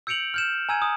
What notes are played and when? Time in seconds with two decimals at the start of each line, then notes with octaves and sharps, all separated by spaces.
0.07 E6 G6 C#7 D7 F7 F#7
0.34 F6 G6 E7
0.69 G#5 A#5 E6 G#6 D#7
0.82 D#6